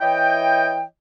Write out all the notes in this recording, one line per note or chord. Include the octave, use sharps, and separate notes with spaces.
E3 E4 C#5 D#5 G5